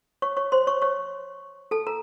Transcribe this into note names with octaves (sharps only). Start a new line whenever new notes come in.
C#5 C#6
C#5 C#6
C5 C6
C#5 C#6
C#5 C#6
A4 A5
A#4 A#5